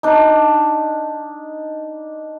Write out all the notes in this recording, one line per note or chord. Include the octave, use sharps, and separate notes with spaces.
D4 D#4